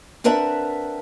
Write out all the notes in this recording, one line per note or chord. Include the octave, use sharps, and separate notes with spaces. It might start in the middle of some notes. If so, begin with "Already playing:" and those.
C4 D4 A#4 B4 E5 F#5